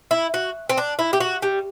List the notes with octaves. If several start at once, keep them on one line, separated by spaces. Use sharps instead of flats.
E4
F#4
C4
D4
E4
G4
F#4
G3